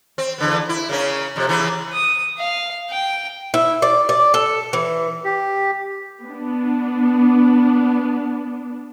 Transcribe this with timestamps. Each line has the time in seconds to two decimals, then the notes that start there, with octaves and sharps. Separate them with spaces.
0.18 C4
0.38 E2 D3 B3
0.69 E4
0.89 C#3 A#3 C#4
1.36 F2 C3
1.47 C#3 E3 B3
1.93 D#6
2.39 F5
2.90 G5
3.54 E4
3.82 D5
4.09 D5
4.34 A4
4.73 E3
5.25 G4
6.24 B3 D4